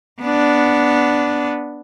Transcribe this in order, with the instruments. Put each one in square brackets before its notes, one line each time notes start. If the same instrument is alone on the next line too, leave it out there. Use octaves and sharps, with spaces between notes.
[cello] B3 D4